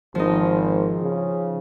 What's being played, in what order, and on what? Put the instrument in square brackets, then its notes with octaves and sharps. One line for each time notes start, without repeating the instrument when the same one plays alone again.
[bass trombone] G#1 [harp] F3 D#4
[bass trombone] C#3